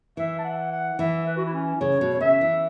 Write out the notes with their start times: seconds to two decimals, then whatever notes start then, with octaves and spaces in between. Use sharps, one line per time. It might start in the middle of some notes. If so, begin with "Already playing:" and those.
0.17 E3 E5
0.38 A5
0.44 F#5
0.72 F#5
0.99 E3 E5
1.26 B4
1.37 F#4
1.45 E4
1.53 C#4
1.81 C#3 C#5
2.01 B2
2.14 C#5
2.20 C#3 E5
2.41 E3